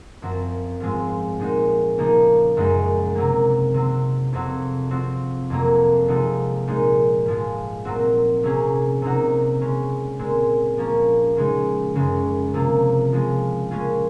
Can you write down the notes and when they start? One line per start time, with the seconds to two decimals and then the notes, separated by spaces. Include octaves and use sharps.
0.22 F#2 F3 C4 F#4
0.80 G#2 F3 G#3 C4 F4
1.40 A#2 G#3 D#4 F#4
1.98 C#3 F3 A#3 D#4
2.57 F#2 C#3 G#3 D#4 F#4
3.15 C3 F#3 A#3
3.74 C3 F#3 C4
4.33 F2 C3 F#3 C4 F#4
4.91 F3 C4 F#4
5.50 F2 C3 F#3 A#3
6.08 C3 F3 G#3 D#4 F#4
6.68 A#2 G#3 D#4
7.26 G#2 F3 G#3
7.85 A#2 F#3 C4 F#4
8.43 C3 F#3 A#3 C#4 G#4
9.02 C3 F#3 A#3 D#4 F#4
9.61 C#3 G#3 C#4
10.19 A#2 G#3 C4
10.78 F3 A#3 C#4
11.37 C#3 G#3 D#4
11.95 F#2 C#3 G#3
12.54 C3 F3 A#3 F4
13.12 C#3 F3 G#3
13.71 A#2 G#3 C#4 F4 G#4